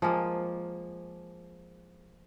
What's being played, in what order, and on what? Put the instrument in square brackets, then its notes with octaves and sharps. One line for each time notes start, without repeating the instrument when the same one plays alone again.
[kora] F3 G#3 A#3